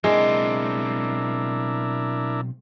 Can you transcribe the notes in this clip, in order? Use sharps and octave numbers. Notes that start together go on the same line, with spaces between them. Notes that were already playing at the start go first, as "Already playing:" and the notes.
B1 G#3 C4 D4 E4 A#4